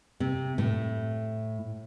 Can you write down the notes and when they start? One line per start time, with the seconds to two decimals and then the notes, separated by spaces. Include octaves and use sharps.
0.20 C3
0.58 A2